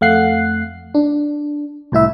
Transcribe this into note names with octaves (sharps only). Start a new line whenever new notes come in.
F2 A3 F5 F#5 F#6 C7
D4
C2 A2 E4 E5